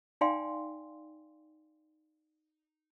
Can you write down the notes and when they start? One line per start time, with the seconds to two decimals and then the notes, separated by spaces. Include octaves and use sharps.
0.21 D#4 D5 F5 G5 G#5 C6